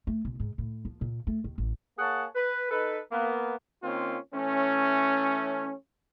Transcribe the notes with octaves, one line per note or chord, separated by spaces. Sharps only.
A3
B1
G#2
A2
F3
A#2
A3
D#2
A1
A#3 G#4 C#5 F#5 A5
B4
D#4 A4 B4
A#3 B3
D#3 A#3 C4 C#4 F4
E3 A3 C#4